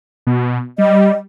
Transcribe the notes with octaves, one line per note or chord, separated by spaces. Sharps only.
B2
G3 D#5